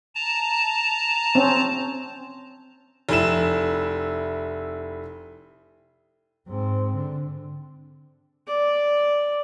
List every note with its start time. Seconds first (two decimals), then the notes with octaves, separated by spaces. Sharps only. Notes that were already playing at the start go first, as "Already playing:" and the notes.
0.15 A5 A#5
1.35 C4 C#4
3.09 F1 E4 E7
6.48 G#2 C4
6.96 D3
8.47 D5